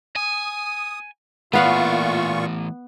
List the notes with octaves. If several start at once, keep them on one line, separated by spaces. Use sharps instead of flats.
G#5 D#6
A#2 E3 A3 B3 F4 F5 F#5 C#6